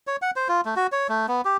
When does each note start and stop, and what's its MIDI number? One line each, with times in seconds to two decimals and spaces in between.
0.07 0.16 73
0.22 0.31 78
0.36 0.48 72
0.49 0.61 65
0.65 0.75 57
0.76 0.87 66
0.92 1.07 73
1.09 1.26 57
1.28 1.41 59
1.45 1.57 67